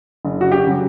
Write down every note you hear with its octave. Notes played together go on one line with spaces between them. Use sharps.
F#1
F#4
G4
C#3 F#3